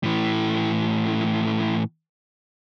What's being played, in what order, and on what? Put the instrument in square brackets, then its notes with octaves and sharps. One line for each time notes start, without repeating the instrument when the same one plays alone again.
[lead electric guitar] A2 E3